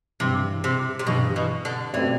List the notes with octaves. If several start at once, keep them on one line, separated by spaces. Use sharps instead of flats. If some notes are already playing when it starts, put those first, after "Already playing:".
G2 C3 E3 G3
C3
C3
G2 B2 E3 G3
B2
D3
B2 E3 A3 C4 G4 D5